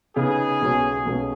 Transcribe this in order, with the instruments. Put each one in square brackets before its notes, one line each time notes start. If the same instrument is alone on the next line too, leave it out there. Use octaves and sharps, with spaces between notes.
[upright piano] C#3 B3 D#4 B4 [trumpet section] G#4
[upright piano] B1 B2 G#3 C#4
B1 B2 G#3 C#4